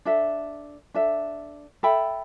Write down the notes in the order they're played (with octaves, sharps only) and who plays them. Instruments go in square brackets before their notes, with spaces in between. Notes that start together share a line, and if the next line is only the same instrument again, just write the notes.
[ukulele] D4 A4 E5
D4 A4 E5
A4 E5 G5 B5